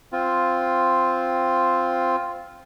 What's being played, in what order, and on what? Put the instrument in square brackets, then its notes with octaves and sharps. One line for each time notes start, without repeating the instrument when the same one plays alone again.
[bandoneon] C4 F4